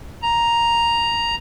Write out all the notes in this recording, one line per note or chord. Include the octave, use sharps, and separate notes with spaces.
A#5